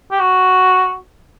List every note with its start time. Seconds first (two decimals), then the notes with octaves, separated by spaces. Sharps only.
0.12 G4
0.20 F#4